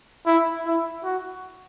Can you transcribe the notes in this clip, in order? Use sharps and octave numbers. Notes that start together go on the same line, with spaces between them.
E4
E4
F#4